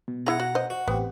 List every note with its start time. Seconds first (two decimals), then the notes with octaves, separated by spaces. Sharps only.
0.08 B2
0.26 E4 G#4 F#5 A#5
0.40 F#4
0.55 C5 D#5
0.70 F#4
0.88 A1 B3 C4 G4